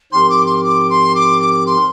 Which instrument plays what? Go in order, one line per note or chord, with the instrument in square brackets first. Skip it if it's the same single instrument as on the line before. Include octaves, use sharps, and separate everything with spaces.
[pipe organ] G#2 F3 C4 G4 A#4 [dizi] C6
[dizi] D6
C6
D6
C6
D6
D6
C6